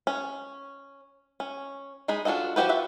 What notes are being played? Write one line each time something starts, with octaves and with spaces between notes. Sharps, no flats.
C#4
C#4
G#3 D#4 G#4 B5
D4 F4 F#4 A4 D#5
F3 C4 F#4 G4 B4
F4 F#4 B4 E5